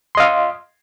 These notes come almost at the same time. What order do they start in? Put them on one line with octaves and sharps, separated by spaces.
C6 D#5 F5